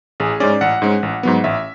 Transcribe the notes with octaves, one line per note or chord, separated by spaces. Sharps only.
A1 G#4
G#2 G#3 C#4 D5
A1 F#5
G#2 G#3 C#4
A1
G#2 F#3 B3
A1 E5